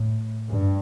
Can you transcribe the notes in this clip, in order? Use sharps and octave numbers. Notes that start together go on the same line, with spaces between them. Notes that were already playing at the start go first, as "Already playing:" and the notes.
Already playing: A2
G2